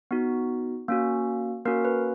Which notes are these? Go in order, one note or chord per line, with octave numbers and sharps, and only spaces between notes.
B3 D#4 F#4
A#3 C#4 F#4
A#3 C#4 F#4 A#4
B4